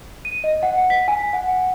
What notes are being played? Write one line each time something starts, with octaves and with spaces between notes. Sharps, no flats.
D#7
D#5
F#5
B6
G#5
F#5